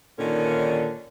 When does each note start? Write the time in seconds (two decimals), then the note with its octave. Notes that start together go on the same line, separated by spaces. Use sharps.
0.19 A#2 D3 D#3 C#4